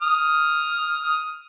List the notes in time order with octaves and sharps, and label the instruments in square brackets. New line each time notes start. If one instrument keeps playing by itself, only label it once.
[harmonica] D#6 F6